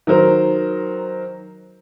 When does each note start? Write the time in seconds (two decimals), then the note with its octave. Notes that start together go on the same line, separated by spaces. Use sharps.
0.07 D#3 F#3 A#4 C5